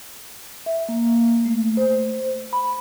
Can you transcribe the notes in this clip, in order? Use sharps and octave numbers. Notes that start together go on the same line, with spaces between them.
E5
A#3
A3
C5
B5